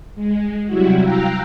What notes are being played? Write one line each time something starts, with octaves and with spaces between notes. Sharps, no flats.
G#3
C3 F#3 G3 E4 F#4
F5 G5 A#5 E6 F#6